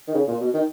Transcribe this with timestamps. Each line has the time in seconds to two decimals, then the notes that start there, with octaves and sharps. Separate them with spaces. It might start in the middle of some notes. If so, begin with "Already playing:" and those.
0.08 D#3
0.14 C#3
0.28 A#2
0.40 B2
0.54 D#3